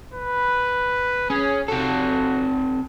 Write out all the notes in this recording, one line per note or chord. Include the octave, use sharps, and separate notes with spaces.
B4
C#4 G#4
C3 F#4 A4